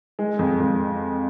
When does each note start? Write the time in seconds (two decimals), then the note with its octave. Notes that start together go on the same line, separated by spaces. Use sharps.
0.19 G#3
0.39 F2
0.60 F2